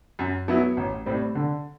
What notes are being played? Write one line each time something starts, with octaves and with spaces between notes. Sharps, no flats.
F#2
F#3 B3 E4
A1
A2 G3 C4
D3